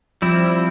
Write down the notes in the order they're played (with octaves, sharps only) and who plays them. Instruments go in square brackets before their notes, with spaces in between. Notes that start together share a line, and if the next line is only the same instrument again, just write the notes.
[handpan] F3 [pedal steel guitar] G3 C4 E4